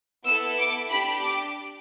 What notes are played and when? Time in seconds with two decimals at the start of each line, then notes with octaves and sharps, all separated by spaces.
0.24 B3 E4 A4 E6
0.57 D6
0.89 D4 G4 B5
1.23 D6